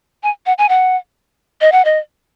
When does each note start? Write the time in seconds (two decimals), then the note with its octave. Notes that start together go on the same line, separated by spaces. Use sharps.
0.23 G#5
0.46 F#5
0.58 G#5
0.69 F#5
1.61 D#5
1.72 F#5
1.85 D#5